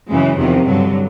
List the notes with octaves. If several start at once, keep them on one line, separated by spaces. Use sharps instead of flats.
F#2 C#3 E3 G#3
E2 C3 D#3 F3
G2 D3 F#3